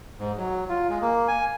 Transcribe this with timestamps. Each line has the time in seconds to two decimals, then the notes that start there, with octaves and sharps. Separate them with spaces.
0.19 G#2
0.37 F#3
0.69 F4
0.89 G#3
1.01 A#3
1.28 G#5